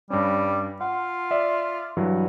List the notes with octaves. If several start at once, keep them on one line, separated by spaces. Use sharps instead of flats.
G2 G3 C#4
F4 F#5
D5 E5
G2 E3 F#3